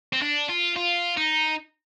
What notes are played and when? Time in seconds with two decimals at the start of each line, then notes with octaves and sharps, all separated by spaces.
0.13 C4
0.22 D4
0.49 F4
0.76 F4
1.17 D#4